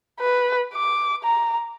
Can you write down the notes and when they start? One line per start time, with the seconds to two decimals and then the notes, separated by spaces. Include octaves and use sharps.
0.20 B4
0.74 D6
1.24 A#5